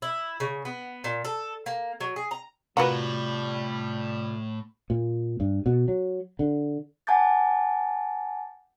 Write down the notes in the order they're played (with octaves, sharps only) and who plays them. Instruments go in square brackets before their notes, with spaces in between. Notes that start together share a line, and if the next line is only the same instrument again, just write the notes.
[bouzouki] E4
C#3
B3
A#2
A4
A#3
F#3
G#4
A#5
[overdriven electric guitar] A2 [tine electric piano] C3 F4 [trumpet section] G3 [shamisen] A#3 F#4 B4
[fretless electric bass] A#2
G2
B2
F#3
D3
[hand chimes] F#5 G#5 A5 D6 G6 A6